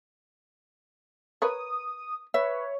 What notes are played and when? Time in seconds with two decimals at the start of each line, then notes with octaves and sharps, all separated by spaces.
1.42 A#4 B4 C#5 D#6
2.34 B4 C#5 E5